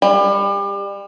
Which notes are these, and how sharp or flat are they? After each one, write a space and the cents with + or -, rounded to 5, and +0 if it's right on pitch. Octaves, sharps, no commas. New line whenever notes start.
G3 +30